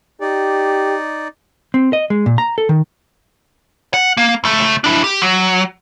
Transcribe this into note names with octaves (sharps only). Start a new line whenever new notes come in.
D#4 G4 D5
C4
D#5
G#3
A#2
A#5
A4
D#3
F#5
A#3
C#2 A3
D4 E4
G4
F#3